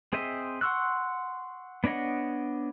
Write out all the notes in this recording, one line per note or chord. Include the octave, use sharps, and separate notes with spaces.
C4 G#4 C5 D#5 E5
F#5 C6 C#6 E6 F#6
B3 D4 C#5 D#5 F#5